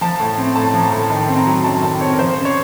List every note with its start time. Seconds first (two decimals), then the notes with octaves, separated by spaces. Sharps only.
0.01 F3 A5
0.20 A2
0.38 C4
0.56 A2 A5
0.74 F3 A#5
0.83 A5
0.92 A2
1.10 D#3 A5
1.28 C4
1.38 A#5
1.47 F#3
1.64 F#2 A5
1.83 D#3 A5
2.01 C4 C#5
2.13 A#4
2.19 F3 C5
2.37 C#3
2.45 C#5